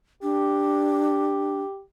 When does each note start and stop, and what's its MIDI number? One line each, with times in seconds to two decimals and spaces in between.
0.23 1.61 62
0.23 1.82 67